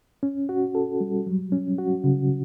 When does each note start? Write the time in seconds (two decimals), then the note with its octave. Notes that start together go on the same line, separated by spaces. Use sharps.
0.23 C#4
0.49 F#4
0.75 A4
1.01 G3
1.27 F#3
1.52 C#4
1.78 F#4
2.04 C#3